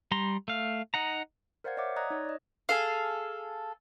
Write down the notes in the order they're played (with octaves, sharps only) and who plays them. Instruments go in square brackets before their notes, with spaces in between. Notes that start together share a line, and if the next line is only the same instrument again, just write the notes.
[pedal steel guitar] G3 A#5 C6
A3 F5
D#4 F#5 A#5
[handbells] A#4 C5 D5 F5 F#5 G#6
C#5 D5 E5 F#5 D6
D5 D#5 A#5 D#6 F#6 G#6
D#4 C#5
D5 D#5
[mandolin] G#4 A4 F5